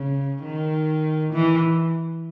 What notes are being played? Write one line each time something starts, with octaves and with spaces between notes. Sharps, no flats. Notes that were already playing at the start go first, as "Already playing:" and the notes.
Already playing: C#3
D#3
E3